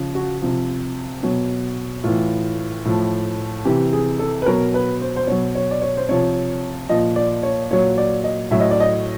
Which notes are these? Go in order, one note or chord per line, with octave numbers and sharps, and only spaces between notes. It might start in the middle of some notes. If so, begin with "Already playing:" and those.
Already playing: C#3 F3
F#4
C3 F3
B2 F#3
A2 E3 F4
A2 F3
C3 E3 G4
G#4
A4
B4
B2 F#3 A#4
B4
C5
C5
B2 F#3 C#5
C#5
D5
C#5
C5
C3 F3 C#5
A#2 F3 D#5
D5
C#5
A#2 F#3 C#5
D5
D#5
A2 F#3 E5
D#5
D5
D#5